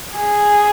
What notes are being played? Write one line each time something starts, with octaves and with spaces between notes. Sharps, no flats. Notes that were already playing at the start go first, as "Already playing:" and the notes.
G#4